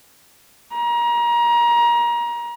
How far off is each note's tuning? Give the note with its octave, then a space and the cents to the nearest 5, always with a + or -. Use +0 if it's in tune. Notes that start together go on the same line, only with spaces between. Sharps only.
A#5 +30